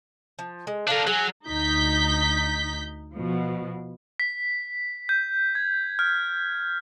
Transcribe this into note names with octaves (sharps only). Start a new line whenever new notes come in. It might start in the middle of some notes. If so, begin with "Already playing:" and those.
F3
G#3
D3 D4 A#4 F5 A5
F#3 G#4
D2 D#4 G6 B6
B2 F3
B6
G6
G#6
F6